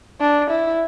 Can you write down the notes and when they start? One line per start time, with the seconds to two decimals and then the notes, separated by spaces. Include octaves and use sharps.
0.21 D4
0.50 E4